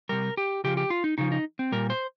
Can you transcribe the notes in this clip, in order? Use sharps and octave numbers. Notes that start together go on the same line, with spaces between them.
C3 G3 A#4
G4
C#3 F3 G4
G4
F4
D#4
C#3 F3 D#4
D#4
C4
A#2 G3 A#4
C5